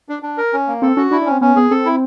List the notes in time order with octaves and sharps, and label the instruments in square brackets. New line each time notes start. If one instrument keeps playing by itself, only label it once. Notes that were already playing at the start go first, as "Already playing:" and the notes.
[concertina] D4
D4
A#4
C#4
A#3
[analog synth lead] C4 [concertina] A4
[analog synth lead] C#4 [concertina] F#4
[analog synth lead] D4 [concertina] E4
[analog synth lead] D4
[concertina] C#4
[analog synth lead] C4
[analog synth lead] B3 [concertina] C#4
[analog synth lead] B3 [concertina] G#4
[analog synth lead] C4 [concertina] A4
[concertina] E4